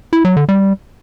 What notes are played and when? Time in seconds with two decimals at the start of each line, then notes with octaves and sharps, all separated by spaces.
0.13 E4
0.25 F#3
0.37 D3
0.49 G3